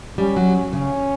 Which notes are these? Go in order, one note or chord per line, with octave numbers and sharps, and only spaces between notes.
G3 C#4
F#3
C#3 C#4